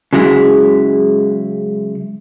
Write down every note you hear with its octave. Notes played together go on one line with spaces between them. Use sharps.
C#3 F#3 G#3 E4